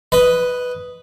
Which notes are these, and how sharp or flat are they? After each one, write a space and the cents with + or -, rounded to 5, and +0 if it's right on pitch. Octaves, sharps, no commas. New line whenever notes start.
B4 +0 D#5 +0 B5 +0